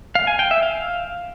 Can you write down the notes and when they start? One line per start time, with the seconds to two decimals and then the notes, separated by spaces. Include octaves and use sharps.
0.15 F5
0.27 G#5
0.39 G5
0.51 E5
0.63 F5